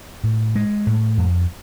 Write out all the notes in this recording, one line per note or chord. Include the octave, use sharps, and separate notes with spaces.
A2
G#3
A2
F2